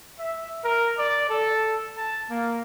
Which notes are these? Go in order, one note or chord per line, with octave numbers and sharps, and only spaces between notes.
E5
A#4
D5
A4
A5
A#3